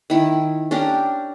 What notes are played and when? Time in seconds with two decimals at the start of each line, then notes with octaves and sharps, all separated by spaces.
0.10 D#3 E4
0.71 C#4 D4 G4 A#4